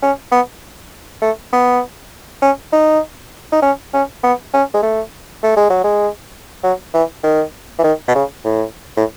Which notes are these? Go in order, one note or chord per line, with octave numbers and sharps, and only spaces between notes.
C#4
B3
A3
B3
C#4
D#4
D#4
C#4
C#4
B3
C#4
G#3
A3
A3
G#3
F#3
G#3
F#3
E3
D#3
E3
D#3
B2
C#3
A2
A2